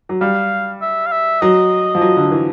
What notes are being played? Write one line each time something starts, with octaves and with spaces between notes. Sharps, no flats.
F#3
G3 F5
E5
F5
E5
F#3 D#5
F3
F#3
D3
E3